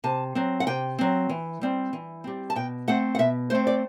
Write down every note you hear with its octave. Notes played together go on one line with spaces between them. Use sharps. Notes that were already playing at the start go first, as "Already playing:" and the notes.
C3 A5
F#3 C4
F#5
C3 G5
F#3 C4
E3
G3 C4
E3
G3 C4
A5
B2 G5
A3 C4 F#5
F#5
B2 E5
A3 C4 C5
D5